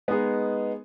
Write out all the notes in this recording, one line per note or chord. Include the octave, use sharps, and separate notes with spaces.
G#3 B3 D#4 G#4